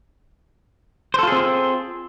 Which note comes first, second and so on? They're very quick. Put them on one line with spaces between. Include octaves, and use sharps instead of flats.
C5 A4 F4 G#4 C4